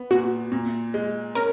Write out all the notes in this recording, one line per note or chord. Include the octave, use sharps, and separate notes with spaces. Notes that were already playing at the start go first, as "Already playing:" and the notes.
Already playing: B3
A#2 F#4
A#2
G#3
C#4 A#4